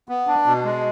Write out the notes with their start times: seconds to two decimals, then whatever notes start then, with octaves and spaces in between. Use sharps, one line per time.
0.09 B3
0.27 D4
0.46 B2
0.65 G#3